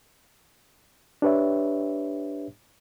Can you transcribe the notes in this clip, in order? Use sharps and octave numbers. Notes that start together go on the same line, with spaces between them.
D4 G4 B4 C#5 E5